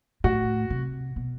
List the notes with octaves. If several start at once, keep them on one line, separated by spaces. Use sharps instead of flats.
A2 F#4
C3
B2